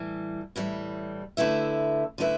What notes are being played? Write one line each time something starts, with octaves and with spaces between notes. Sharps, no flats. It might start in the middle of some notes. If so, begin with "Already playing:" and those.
Already playing: A2 E3 G3
A2 E3 G3
D3 A3 E4 B4 E5
D3 A3 E4 B4 E5